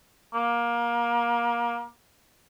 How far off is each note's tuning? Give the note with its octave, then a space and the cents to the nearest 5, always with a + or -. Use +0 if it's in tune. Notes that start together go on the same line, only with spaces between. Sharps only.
A#3 +20